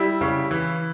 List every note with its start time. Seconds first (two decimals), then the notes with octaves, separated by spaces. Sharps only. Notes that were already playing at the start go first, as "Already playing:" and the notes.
Already playing: G3 E4
0.21 C#3
0.51 E3